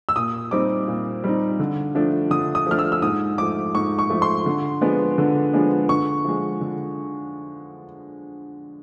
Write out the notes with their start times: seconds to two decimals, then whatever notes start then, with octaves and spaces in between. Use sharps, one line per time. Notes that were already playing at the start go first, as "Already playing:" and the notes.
0.09 E6
0.16 A#2 D#6
0.51 G3 C4 D#4 D6
0.88 A#2
1.24 G3 C4 D#4
1.60 D3
1.95 F3 A3 D4
2.30 D3 D#6
2.55 D#6
2.67 F3 A3 D4 F6
2.79 E6
2.92 E6
3.02 G#2 D#6
3.38 F3 A3 D6
3.75 G#2 C#6
3.99 C#6
4.10 F3 A3
4.22 C6
4.46 D3
4.81 F3 G#3 B3 D4
5.18 D3
5.53 F3 G#3 B3 D4
5.89 D3 C#6
6.25 F3 G#3
6.61 D3